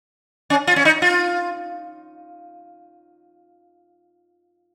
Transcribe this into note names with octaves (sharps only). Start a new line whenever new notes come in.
C#4
F4
C#4
D#4
F4